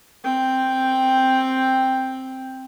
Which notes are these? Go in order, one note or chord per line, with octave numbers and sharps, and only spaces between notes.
C4 G5